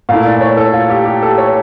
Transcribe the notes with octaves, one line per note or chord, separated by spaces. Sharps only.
A#2 A3 E4 F5
D5
C#5
A4
F4
G4
G4
A4
C#5